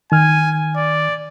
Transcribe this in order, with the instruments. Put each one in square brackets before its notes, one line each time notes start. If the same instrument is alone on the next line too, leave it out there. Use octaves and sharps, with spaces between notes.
[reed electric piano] D#3 F6 [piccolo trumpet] G#5
[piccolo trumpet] D5